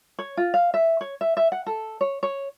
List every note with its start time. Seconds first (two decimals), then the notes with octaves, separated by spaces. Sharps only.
0.19 C#5
0.37 F4
0.54 F5
0.74 E5
1.01 C#5
1.21 E5
1.37 E5
1.52 F#5
1.66 A4
2.01 C#5
2.23 C#5